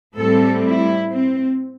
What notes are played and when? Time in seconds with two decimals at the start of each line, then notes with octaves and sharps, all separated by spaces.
0.16 A2 G3 C4 A4
0.63 E4
1.11 C4